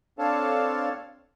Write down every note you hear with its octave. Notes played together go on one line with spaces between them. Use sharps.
C4 D4 A4 C#5 F5 A5